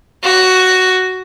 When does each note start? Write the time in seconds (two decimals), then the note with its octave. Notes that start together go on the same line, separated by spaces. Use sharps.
0.24 F#4